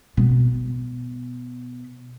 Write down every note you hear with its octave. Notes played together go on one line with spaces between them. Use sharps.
B2 B3